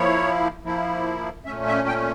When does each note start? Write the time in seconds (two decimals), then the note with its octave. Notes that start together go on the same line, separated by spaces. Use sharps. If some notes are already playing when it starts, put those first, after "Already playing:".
Already playing: F3 A#3 E4 C#5
0.64 F3 A#3 E4
1.46 A#2 A3 C#4 E5
1.67 E5
1.88 G5